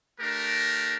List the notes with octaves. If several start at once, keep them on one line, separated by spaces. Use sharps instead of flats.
A3 D4 G4 A#4